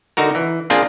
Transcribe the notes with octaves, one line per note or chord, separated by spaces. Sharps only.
D3 D#4 F#4 A#4
E3
A#3 C4 D4 F4 G#4